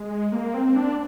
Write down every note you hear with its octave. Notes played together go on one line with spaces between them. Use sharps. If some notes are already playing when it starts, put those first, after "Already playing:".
Already playing: G#3
A#3
C4
D4